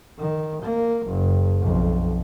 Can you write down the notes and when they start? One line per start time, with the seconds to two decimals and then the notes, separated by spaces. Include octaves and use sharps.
0.18 D#3
0.62 A#3
1.07 F#1
1.61 B1 F2